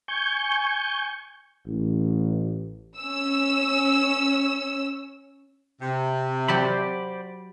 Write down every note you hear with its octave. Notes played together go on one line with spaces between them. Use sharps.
G#5 C#6 G6
A1
C#4 E6
C3
F#3 F#4 G4 C5 D5 B5